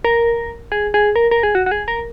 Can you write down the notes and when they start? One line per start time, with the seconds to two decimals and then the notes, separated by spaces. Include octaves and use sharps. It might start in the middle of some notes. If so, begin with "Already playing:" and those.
0.04 A#4
0.72 G#4
0.94 G#4
1.16 A#4
1.31 A#4
1.43 G#4
1.55 F#4
1.66 F#4
1.71 G#4
1.88 A#4